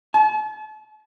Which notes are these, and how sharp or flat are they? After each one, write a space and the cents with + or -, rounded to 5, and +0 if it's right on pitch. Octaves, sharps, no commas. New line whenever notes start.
A5 -40